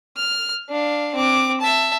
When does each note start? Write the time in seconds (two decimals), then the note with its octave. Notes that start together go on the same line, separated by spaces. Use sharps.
0.17 F6
0.70 D4 F5
1.15 C4 D6
1.61 E5 A5